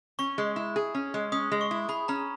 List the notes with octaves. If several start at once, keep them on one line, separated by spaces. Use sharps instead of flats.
C#4 C#6
G#3
E4
G#4
C#4
G#3
C#4 D#6
G#3
C#6
E4
G#4 B5
C#4 A#5